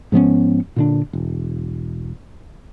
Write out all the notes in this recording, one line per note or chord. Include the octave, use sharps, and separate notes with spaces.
G#2 F3 B3 C#4
A#2 D3 D4
E1